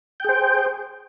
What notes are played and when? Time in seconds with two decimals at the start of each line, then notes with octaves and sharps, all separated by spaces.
0.20 G5
0.24 G#4
0.29 C5